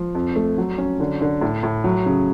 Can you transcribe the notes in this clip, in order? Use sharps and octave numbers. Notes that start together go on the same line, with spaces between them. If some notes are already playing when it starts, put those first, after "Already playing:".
Already playing: F3
F2
A3
F#3
C#4
D3
D3
A2
A2
F#3
C#3